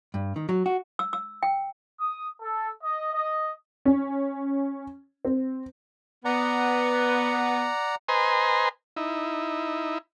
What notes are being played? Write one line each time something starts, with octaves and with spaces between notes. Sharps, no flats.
G2
D#3
F#3
F#4
E6
E6
G5
D#6
A4
D#5
D#5
C#4
C4
B3 D5 F#5 A#5
B4 C5 D#5 G#5 A#5 C6
D#4 E4